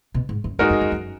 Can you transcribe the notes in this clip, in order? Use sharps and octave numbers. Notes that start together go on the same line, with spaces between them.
B2
G#2
F#2
F#2 G#3 D#4 F#4 A#4
F2
F#2
F#2